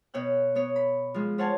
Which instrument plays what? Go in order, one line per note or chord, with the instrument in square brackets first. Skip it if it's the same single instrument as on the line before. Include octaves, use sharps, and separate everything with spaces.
[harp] B2 C#5 G5 F#6
B3 C#5
B5
F3 G#3
F4 C5 C#5 F#5 G#5 A5